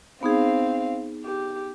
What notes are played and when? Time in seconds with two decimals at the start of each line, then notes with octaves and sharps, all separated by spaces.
0.23 B3 C4 D#4 G#4 F5
1.25 G4